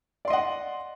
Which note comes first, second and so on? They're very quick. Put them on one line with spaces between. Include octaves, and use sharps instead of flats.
D5 C6 D#5 F#5